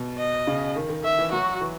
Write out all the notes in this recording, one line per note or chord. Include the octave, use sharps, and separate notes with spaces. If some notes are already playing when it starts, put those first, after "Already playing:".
Already playing: B2
D#5
C#3
D#3
D#3
D#3 E5
E3
F#3 F#4
E3